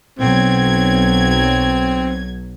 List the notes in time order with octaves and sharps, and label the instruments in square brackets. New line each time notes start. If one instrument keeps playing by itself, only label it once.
[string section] B1 F#3 G#6 [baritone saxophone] C4